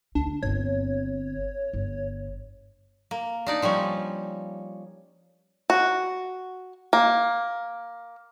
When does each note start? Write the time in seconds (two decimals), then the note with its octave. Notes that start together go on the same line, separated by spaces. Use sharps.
0.15 D2 D4
0.43 G1 C4 C#5
1.73 G1
3.11 A#3
3.47 D4 D#4 D5
3.62 F3 G3 C#4 C#5
5.70 F#4
6.93 A#3